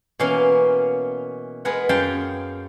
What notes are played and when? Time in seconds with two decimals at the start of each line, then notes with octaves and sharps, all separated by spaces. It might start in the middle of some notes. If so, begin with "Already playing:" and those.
0.19 B2 E3 A#3 C#4 F5 C6
1.65 G#3 B3 G#4 A#4 B4 F#5
1.89 F#2 G#4 F5 G5 A5 C6